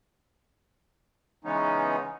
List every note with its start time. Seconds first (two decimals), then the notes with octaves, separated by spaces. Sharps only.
1.45 C#3 E3 G#3 B3 C#4 D#4